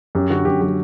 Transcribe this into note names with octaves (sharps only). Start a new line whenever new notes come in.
F#2 G4
D3 F#4
F#2 G4
F#3 G4